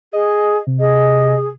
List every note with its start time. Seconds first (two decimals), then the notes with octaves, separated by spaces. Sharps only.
0.13 G#4 D#5
0.67 C3
0.79 G#4 D#5